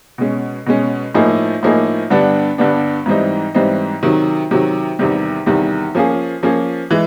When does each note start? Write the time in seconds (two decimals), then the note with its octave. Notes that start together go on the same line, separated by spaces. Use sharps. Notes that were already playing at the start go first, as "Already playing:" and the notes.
0.18 B2 G#3 C#4
0.66 B2 G#3 C#4
1.15 A2 F3 A#3 D#4 G#4
1.63 A2 F3 A#3 D#4 G#4
2.10 G2 D3 G3 B3 D4
2.58 G2 D3 G3 B3 D4
3.06 G#2 E3 G3 C4 D#4
3.55 G#2 E3 G3 C4 D#4
4.03 C3 D#3 F#3
4.51 C3 D#3 F#3
4.99 E2 C3 D#3 G3
5.46 E2 C3 D#3 G3
5.95 F3 A#3 C#4 F4 G#4
6.43 F3 A#3 C#4 F4 G#4
6.91 E3 G#3